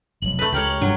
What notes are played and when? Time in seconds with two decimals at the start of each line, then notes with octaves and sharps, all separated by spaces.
0.22 F1 B1 F#7
0.39 A3 B4
0.53 C#2 G4 A#4 C#5
0.81 E1 G2 F#3 D4